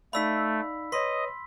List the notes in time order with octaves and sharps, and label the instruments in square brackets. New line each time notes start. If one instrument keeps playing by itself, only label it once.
[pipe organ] A3 [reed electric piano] D#4 D5 F5 [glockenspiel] B5 E6 B6
[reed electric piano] B4 C#5 [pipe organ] D#5 [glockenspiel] C6 B6